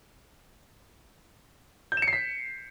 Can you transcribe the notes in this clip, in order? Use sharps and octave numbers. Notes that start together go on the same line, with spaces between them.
G6
E7
C#7
C7
B6